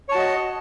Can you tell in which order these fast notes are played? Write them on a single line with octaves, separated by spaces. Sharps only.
C#5 A5 F#4 D#5